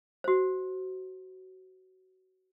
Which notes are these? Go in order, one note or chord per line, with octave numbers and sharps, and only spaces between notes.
F#4 C5